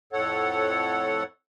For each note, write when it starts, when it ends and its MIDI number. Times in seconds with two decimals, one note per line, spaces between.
0.13 1.23 41
0.13 1.23 45
0.13 1.23 69
0.13 1.23 73
0.13 1.23 78